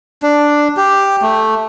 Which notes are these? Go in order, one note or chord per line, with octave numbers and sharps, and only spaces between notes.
D4
G4
A3